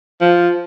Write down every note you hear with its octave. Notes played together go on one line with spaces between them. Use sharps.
F3